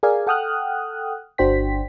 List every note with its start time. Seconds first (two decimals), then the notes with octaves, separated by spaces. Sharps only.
0.03 G#4 A#4 D5 F5 G#5
0.27 A4 F#5 G5 D#6 F6 F#6
1.38 G1 D4 F#4 C5 G5 B6